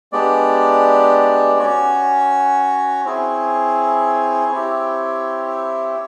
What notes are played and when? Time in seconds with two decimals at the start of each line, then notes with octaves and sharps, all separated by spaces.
0.12 G#3 B3 D4 G4 D5
1.59 C#4 F#4 C#5
3.05 C4 E4 G#4 C#5
4.52 C4 E4 G4